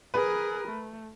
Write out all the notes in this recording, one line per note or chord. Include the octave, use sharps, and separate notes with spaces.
G#4 A#4 B4
A3